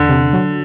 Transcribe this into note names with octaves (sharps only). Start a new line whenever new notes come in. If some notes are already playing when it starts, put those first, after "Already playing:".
Already playing: E2 D3 D4
C3
F#3